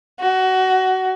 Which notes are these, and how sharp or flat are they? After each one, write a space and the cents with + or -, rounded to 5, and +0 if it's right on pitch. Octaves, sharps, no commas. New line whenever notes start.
F#4 +20